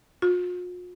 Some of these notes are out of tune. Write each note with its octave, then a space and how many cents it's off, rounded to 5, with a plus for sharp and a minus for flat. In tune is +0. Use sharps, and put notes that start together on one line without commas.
F4 +45